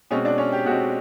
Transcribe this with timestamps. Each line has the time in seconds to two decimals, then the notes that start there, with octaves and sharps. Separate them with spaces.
0.11 B2 G#3 C4 C#4 C#5
0.25 D4 D5
0.38 C#4 C#5
0.52 G4
0.65 B2 G#3 C4 F#4